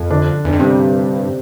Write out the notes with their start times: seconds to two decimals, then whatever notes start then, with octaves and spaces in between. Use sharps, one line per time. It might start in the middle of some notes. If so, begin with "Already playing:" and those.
Already playing: F2
0.10 D3 D4
0.45 E2
0.48 F2 D4
0.59 G2 C3 C4